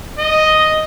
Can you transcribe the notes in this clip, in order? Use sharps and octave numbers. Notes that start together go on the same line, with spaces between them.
D#5